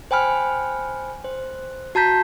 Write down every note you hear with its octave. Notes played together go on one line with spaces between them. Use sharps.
C5 G5 G#5 B5 F6
C5
F#4 A5 A#5 G6 B6